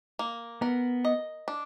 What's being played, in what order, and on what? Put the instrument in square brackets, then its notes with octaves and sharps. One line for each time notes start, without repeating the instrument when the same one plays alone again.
[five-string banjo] A#3
[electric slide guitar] B3 [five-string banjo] A#4
[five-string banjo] D#5
D4